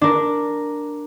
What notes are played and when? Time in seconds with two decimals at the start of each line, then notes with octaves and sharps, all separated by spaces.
0.01 D4 A#4